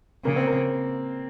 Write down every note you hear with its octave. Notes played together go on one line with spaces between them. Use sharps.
C#3 A#3
C4
A#3